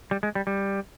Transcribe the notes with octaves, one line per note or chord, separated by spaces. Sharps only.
G3
G#3
G3
G3